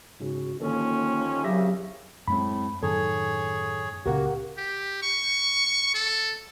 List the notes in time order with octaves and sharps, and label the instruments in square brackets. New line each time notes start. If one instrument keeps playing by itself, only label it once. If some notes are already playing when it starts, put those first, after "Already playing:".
[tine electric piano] G#2 C#3 [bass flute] F#4
[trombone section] D#2 F3 C#4 [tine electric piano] D3 D#3 A4 [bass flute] A#3
[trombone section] C2 F#2 C#3 [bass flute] F#3 [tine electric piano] G4 E5 A#6
[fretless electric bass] F#2 G#3 C4 [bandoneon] A2 [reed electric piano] B5
[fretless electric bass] F#2 A2 D#3 [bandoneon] G#4 C#5 [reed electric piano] A4
[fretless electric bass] C#2 A#2 C#3 [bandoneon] A#3 F#4 [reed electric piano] G4 A#4 F#5
[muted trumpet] G4
C#6
A4